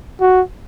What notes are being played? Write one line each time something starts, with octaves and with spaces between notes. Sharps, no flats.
F#4